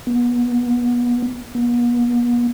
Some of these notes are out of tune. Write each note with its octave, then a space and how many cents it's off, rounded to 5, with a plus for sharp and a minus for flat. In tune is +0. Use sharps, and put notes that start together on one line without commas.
B3 -30
B3 -45